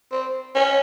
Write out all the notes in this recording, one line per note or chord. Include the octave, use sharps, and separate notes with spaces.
C4
C#4